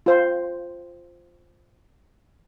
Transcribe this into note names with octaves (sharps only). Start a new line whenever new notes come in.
F4 C5